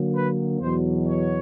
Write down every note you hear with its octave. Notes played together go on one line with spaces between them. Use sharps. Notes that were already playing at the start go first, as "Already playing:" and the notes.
Already playing: D3 F#3 A#3
B4
E2 B2 F#3 C5
C#5